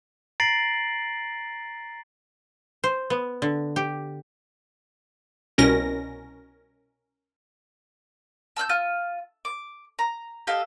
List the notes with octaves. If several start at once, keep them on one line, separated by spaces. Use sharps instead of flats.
A#5 A6 A#6 C7 D7 F#7
C5
B3
D3
G4
C2 B2 C#4 A#4 A#6
A5 E6 F#6 G6
F4
D6
A#5
G4 A4 D#5 F5